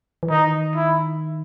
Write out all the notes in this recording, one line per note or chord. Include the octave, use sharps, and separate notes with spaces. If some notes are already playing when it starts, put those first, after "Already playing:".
E3
D#3 D#4
E4